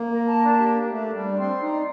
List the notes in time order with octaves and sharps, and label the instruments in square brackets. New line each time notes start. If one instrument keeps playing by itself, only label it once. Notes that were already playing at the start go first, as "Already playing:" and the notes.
Already playing: [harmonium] A#3
[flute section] A#4
A5
D4
G4
D4
[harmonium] A3 [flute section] D4
[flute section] D4
[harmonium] G3
[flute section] D5
[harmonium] D4
[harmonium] C4 [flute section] C6
[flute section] D5
[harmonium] D#4
[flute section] C6